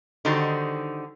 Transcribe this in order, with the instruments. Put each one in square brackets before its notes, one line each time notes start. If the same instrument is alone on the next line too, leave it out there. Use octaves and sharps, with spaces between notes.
[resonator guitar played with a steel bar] D3 D#3 G3 D#4 F#4 C5